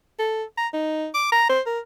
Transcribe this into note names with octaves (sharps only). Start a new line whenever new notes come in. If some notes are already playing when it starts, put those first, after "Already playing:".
A4
A#5
D#4
D6
A#5
C5
A#4